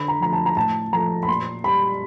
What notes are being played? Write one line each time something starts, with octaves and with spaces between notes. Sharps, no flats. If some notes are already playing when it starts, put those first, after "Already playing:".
Already playing: D3 B5
A#5
F3 A3 A#5
A5
A#5
A2 A5
F3 A3 A#5
B5
A#2 C6
G3 B5